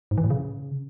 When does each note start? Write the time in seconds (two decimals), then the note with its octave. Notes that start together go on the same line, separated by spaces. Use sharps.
0.11 G#2
0.18 E3
0.24 A2
0.30 C#3